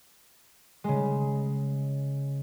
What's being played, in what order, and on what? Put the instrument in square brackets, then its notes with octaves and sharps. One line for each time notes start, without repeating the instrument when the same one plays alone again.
[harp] C#3 G#3